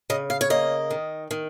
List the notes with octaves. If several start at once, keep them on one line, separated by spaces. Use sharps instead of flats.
C#3 D#5
F5
C#5
A#3 D#5
D#3
D#3